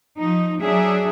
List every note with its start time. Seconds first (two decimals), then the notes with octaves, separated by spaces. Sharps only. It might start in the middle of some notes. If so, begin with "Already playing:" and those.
0.18 F3 D#4
0.61 F#3 D4 G#4 E5